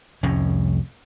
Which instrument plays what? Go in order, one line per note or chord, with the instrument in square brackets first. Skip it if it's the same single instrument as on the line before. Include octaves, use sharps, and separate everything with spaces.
[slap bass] C2 F2 A2 C#4